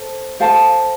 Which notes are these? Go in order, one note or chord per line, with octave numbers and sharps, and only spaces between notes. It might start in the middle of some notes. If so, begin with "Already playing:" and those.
Already playing: A4 C5
A4 C5 F5 A5